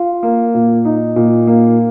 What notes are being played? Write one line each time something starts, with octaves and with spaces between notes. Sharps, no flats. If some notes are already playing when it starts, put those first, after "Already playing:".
Already playing: F4
A#3
A#2
D#4
A#2
A#3